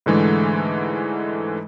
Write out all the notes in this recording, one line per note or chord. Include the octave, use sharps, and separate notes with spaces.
G#2 D3 E3 G#3 A3